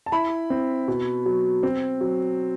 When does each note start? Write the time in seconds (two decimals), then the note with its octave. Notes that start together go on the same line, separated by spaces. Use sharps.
0.06 A5
0.12 E4 B5
0.50 C4
0.88 B2
1.26 F#3
1.63 C4
2.01 F#3